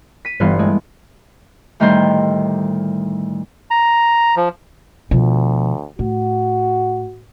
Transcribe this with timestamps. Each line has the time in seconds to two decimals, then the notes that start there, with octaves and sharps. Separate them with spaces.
0.25 B6 D#7
0.40 G1 G2 E3 B3 F5 C6
0.59 G#3 A3
1.80 D2 A2 D#3 G3 C5
3.71 A#5
4.36 F3
5.11 D2 B2 F3
5.99 A2 F#4